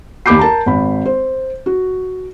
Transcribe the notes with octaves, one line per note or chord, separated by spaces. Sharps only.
D#2 G4 B5 D6 G6 C7
A#4 A5 A#5
G#1 B5
C5
F#4